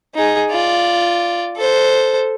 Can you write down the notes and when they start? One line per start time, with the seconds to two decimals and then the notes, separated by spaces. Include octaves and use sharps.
0.15 D#4 G#4
0.51 F4 D5
1.57 A4 C5